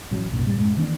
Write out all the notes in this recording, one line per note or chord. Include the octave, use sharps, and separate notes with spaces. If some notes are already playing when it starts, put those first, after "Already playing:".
A1 F#3
B1 F#2 A#2
A1 A2 G3
F#2 A2 G#3
D#3 E3 A#3 D4